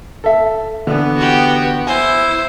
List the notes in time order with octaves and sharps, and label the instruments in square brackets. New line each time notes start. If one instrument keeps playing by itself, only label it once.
[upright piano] A4 E5
[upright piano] D3 E3 [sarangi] B3
[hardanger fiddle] F#4 G4
[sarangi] E4 [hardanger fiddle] C5 [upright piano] G#5